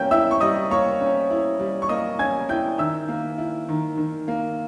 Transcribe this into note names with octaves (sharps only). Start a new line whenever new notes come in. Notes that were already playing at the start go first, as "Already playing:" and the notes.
Already playing: G3 A#3 C#4 G5 G6
E4 E5 E6
C#6
G3 D#5 D#6
A#3 C#5 C#6
C#4
E4
G3
C#6
A#3 D#5 D#6
C#4 G#5 G#6
E4 G5 G6
D#3 E5 E6
A#3
E4
D#3
D#3
A#3